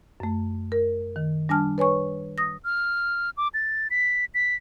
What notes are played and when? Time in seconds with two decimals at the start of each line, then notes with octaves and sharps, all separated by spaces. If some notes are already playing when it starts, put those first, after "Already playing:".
0.20 F#2 A3
0.72 A#4
1.16 D#3
1.49 G3 D4 G#5 A5 F6
1.78 B4 C#5 G#5 C#6
2.38 D#6 A#6
2.64 F6
3.37 D6
3.54 A6
3.91 B6
4.34 B6